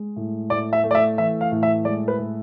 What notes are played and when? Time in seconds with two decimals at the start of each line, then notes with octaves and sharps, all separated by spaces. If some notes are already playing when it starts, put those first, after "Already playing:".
Already playing: G#3
0.16 A2
0.50 A2 D5
0.73 E5
0.84 A3
0.91 D5
0.95 E5
1.18 E3 E5
1.41 F5
1.52 A2
1.63 E5
1.85 G#3 D5
2.08 B4
2.19 A2